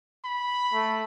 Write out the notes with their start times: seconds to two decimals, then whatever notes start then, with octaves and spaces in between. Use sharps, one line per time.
0.24 B5
0.74 A3